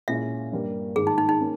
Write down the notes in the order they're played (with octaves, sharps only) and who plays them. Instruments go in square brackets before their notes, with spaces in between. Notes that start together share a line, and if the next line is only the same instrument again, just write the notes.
[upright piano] A#2 G#3 C#4 E4 [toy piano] E5
[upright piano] G2 G3 A#3
[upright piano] G#2 D#3 G#3 [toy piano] G#4
[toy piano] D#4
D#4
D#4
[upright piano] A#3 C#4